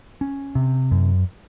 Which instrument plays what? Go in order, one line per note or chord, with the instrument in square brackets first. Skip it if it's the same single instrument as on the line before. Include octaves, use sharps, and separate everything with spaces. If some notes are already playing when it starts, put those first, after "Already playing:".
[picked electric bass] C#4
C3
F#2